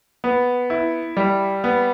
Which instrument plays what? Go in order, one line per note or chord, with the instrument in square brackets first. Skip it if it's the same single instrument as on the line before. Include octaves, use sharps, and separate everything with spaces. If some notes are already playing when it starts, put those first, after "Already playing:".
[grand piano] B3
E4
G3
B3